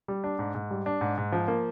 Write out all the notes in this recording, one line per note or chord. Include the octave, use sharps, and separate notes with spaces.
G3
D4
G#2
G#2
G3
D4
G#2
G#2
F3
A#3